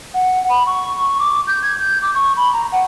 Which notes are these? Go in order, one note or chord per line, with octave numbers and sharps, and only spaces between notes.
F#5
B5
C#6
D6
G6
G#6
G6
D6
C#6
B5
A#5
F#5